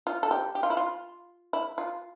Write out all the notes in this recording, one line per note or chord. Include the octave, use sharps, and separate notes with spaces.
F4
A4
G4
G4
F4
E4
F4
E4
F4